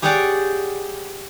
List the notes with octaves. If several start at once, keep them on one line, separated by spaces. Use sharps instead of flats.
G4 G#4 C#5 D5 F#5 G5